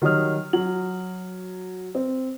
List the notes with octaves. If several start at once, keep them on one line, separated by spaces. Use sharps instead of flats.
D#3 F#3 G3 C#5 D#6 F6
F#3 F#7
C4